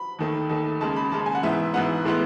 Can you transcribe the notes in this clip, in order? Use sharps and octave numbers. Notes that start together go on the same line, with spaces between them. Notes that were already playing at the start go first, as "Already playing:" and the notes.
Already playing: B5
D#2 D#3 A3
D#2 D#3 A3
D#2 C#3 G#3 A5
B5
D#2 C#3 G#3 A5
G#5
F#5
G#2 E3 B3 E5
G#2 E3 B3 F#5
A2 E3 G#3 B3